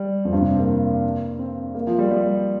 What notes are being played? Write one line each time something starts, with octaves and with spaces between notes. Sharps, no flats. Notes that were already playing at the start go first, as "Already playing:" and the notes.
Already playing: G3
F2
G2
C3
C4
A#3
C4
A#3
F3
G3
G3